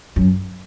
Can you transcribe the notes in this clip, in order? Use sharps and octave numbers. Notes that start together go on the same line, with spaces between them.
F#2